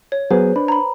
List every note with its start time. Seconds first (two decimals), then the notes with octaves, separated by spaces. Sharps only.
0.12 C#5
0.31 F#3 B3 G#4 B4 C5
0.56 D4 B5
0.68 A#5 B5